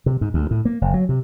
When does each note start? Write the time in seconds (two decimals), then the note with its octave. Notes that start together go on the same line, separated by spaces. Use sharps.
0.06 C3
0.21 G#2
0.34 D2
0.51 A2
0.65 A#3
0.81 F#1
0.94 F#3
1.09 C3